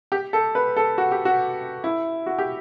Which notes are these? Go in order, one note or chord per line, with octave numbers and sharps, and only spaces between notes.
G4
A4
B4
A4
F#4
G4
F#4
E4
F#4
G4